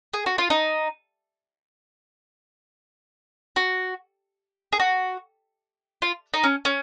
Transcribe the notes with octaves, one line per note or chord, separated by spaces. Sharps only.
G#4
F#4
F4
D#4
F#4
G#4
F#4
F4
D#4
C#4
C#4